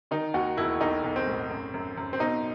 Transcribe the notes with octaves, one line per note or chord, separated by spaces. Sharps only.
D#3 D#4
D#2 F#4
E1 E4
B1 D#4
B1
C4
A2
F#2
F#2
F#2
C4
B2 D#4